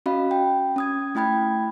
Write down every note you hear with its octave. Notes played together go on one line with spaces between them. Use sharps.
C#4 F#4 D#5 F5 B5
G5
C#4 D#6 G#6
A3 E4 G5 B5 G#6